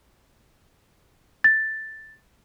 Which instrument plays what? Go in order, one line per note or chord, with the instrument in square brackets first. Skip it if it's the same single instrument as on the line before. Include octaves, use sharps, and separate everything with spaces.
[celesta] A6